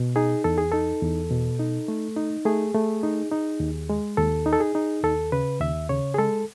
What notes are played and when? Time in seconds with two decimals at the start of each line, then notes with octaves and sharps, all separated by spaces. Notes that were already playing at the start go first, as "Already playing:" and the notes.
Already playing: B2
0.16 D#4 G#4
0.44 E2 A4
0.58 G#4
0.72 D#4 A4
1.02 E2
1.31 B2
1.60 D#4
1.88 A3
2.16 D#4
2.45 A3 G#4
2.74 A3
3.03 D#4
3.32 D#4
3.60 D#2
3.90 G#3
4.17 D#2 A4
4.46 D#4
4.53 A4
4.60 G#4
4.75 D#4
5.03 D#2 A4
5.32 C#3 B4
5.60 D#2 E5
5.89 C#3 C#5
6.14 G#4
6.18 G#3 A4